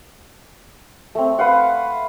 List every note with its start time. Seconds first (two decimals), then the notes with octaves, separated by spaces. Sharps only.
1.15 A3 C4
1.39 B4 F5 F#5